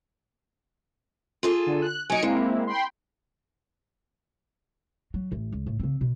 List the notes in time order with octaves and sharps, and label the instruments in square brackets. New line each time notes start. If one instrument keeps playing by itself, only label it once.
[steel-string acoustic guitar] F4 G#4 A4
[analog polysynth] D3
F#6
[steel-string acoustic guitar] F#3 D#4 [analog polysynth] G#5 C#7 D7
[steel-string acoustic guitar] G#3 [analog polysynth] A#3 C4 E4
[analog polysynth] G5 B5 C6
[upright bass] F#3
A1
C#2
A2
C#3 C4
B2